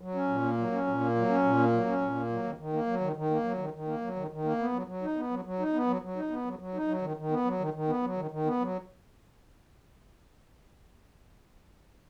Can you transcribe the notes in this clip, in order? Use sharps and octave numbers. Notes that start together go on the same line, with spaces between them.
F#3
C#4
A#2
A#3
F#3
C#4
A#2
A#3
F#3
C#4
A#2
A#3
F#3
C#4
A#2
A#3
F#3
D#3
D#3
A#3
F#3
D#3
D#3
A#3
F#3
D#3
D#3
A#3
F#3
D#3
D#3
A#3
B3
F#3
F#3
D#4
B3
F#3
F#3
D#4
B3
F#3
F#3
D#4
B3
F#3
F#3
D#4
F#3
D#3
D#3
B3
F#3
D#3
D#3
B3
F#3
D#3
D#3
B3
F#3